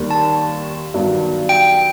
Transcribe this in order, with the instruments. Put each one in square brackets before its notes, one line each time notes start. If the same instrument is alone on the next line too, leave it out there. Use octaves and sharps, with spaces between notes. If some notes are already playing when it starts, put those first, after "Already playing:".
Already playing: [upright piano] D#2 D#3 G3
[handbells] A5
[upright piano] G2 D#3 F#3 B3
[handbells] G5